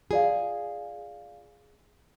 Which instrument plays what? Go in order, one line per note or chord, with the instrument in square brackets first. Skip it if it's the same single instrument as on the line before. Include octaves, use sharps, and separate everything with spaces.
[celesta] F4 D5 F5 [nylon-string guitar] G#4